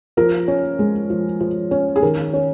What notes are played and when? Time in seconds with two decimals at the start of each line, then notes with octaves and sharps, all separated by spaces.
0.17 F3 A#4
0.48 C#4
0.79 G#3
1.10 F3
1.41 F3
1.71 C#4
1.96 G#4
2.02 D#3 A#4
2.33 C#4